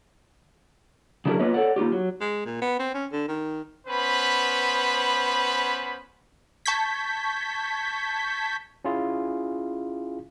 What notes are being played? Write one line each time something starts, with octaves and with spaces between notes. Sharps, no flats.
C#3 F#3 D4 E4 G#4 A#4
A#3 B3 F4 B4 C#5 D#5
A4 C#5 D5 F#5
A#3 D#4 F4 G4
F#3
G#3
A#2
B3
C4
C#4
D3
D#3
B3 C#4 B4 C5 B5
A5 C#6 G6 G#6 B6
C#4 E4 F4 G#4